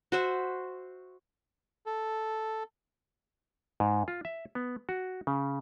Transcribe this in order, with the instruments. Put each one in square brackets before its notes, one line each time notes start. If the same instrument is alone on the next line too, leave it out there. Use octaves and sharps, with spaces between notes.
[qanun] F#4 C5 E5
[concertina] A4
[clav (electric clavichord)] G#2
F4
E5
B3
F#4
C#3